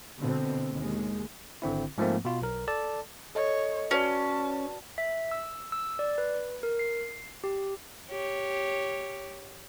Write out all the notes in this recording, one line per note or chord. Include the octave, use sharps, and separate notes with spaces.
B2 D3 C4
D#2 G#3
G#1 D3 C4 E4
G#2 F3 A3 A#3 C4
B2 F4
B1 A#4
A4 D5 A5
A4 C#5 D#5
C#4 F#4 B4 D5 A5
E5
E6
E6
D5
B4
A#4
C7
G4
G4 C#5